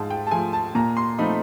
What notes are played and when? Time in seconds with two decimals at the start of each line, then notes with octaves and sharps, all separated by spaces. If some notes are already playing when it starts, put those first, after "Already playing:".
Already playing: G#2 F3 A5
0.10 G5
0.27 A5
0.31 F3 A3 G#5
0.53 A5
0.75 A#2 A#5
0.97 C6
1.18 F3 A3 C4 D#4 B5